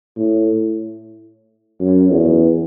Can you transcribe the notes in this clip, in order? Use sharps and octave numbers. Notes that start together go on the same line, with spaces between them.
A2
F#2
E2